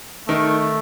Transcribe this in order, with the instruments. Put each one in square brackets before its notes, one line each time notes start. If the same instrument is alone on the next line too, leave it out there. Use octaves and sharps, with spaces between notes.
[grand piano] D#3 [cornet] A3